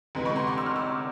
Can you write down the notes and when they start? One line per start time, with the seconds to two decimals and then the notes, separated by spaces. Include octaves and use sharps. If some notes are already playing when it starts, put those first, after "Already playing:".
0.15 D2 C3 E3 G#3 B3
0.25 B5 C#6
0.36 A#5 C6
0.47 C6 D6
0.58 E6
0.66 F6
0.76 D6 E6